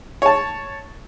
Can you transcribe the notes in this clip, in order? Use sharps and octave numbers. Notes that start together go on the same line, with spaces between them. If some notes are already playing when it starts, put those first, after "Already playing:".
C#5 A5